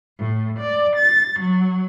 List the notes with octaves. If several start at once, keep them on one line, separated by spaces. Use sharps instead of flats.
A2
D5
A6
F#3